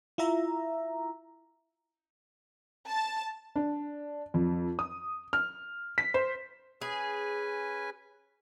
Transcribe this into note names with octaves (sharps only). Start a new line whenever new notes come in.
E4 F4 E5 A#5
A5
D4
F2
D#6
F6
B6
C5
C#4 G#4 B4 G#5